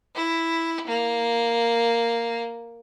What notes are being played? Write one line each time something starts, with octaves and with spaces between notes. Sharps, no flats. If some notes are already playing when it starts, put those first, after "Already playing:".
E4
A#3